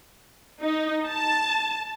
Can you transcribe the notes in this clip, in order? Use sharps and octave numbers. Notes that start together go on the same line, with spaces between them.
D#4
A5